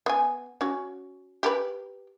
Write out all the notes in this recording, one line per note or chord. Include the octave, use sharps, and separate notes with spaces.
B3 G#5
C#4 F#4
G4 A#4 B4